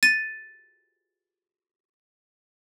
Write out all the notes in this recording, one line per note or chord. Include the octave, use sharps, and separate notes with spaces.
A6 D#7